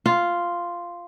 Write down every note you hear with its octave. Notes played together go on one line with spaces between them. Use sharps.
F4